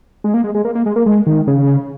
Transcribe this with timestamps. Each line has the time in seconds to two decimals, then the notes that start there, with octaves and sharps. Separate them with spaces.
0.24 G#3
0.34 A#3
0.44 G#3
0.55 G#3
0.65 A#3
0.75 A#3
0.86 G#3
0.96 A#3
1.06 G#3
1.27 D#3
1.47 C#3